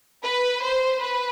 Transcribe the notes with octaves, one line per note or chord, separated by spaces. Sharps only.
B4
C5
B4